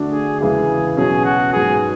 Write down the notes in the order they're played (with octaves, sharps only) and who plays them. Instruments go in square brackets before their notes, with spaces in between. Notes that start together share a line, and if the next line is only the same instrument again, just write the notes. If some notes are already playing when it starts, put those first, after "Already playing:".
Already playing: [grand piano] D3 A3 D4 F#4
[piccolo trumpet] G#4
[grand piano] E2 C#3 E3 G#3 [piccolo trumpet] G#4
[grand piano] B2 F#3 C#4 [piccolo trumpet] G#4
[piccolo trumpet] F#4
[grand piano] G#2 F#3 B3 [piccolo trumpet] G#4